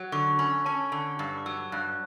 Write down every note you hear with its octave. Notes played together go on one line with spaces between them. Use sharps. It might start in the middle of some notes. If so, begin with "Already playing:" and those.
Already playing: F#3
D3 C#6
C#4 B5
C#4 A5
D3 B5
G2
D6
F#3 E6
G2 F#6